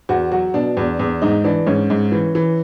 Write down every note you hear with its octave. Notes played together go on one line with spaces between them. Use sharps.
E2 F#4
F#3 F#4
B2 D4
E2
E2
G#2 D#4
E3 D4
G#2 C#4
G#2
E3
E3